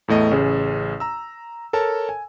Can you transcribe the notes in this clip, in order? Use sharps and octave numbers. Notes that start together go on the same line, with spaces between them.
E2 A2 A3 D#5
A1 C#3 G#4
A#5 E6
A4 A#4 C#5 A5
G#5